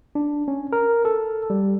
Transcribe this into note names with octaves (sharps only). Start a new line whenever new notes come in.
D4
C#4
A#4
A4
G3